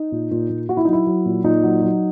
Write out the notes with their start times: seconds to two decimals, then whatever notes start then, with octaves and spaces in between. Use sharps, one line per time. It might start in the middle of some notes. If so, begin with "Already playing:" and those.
Already playing: D#4
0.12 A#2
0.31 A#2
0.50 A#2
0.69 A#2 F#4
0.77 E4
0.85 F#3 D#4
0.93 E4
1.07 F#3
1.25 A#2
1.44 A#2 D#4
1.63 F#3
1.82 F#3